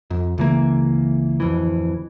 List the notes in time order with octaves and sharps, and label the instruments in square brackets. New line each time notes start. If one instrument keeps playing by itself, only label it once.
[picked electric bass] F2
C#2 E3 A#3
D1 F2 E3